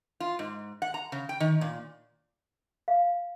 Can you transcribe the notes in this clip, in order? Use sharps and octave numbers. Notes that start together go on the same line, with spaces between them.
F4
G#2
F#5
A#5
C#3
G5
D#3
A#2
F5